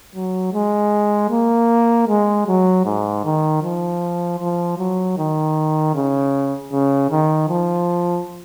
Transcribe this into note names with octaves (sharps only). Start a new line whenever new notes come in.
F#3
G#3
A#3
G#3
F#3
G#2
D#3
F3
F3
F#3
D#3
C#3
C#3
D#3
F3